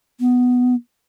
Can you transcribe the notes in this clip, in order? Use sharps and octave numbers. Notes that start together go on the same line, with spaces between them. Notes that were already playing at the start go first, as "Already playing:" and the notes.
B3